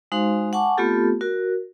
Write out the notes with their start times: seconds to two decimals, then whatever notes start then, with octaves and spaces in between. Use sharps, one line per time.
0.12 G#3 D#4 F#4 C5 F5 C6
0.53 F#5 G#5 A5 C#6 D6
0.78 A3 B3 C4 F4 G4 A4
1.21 F#4 A#4